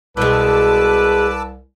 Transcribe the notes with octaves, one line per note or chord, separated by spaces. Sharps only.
C2 B2 G#3 B4 A5 D6 E6